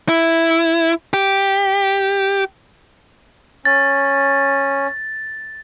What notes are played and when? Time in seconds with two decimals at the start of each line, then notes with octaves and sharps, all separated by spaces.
0.09 E4
1.14 G4
3.65 C#4 A6